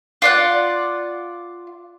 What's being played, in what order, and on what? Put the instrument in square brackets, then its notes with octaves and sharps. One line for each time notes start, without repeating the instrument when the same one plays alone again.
[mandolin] F4 D5 F#5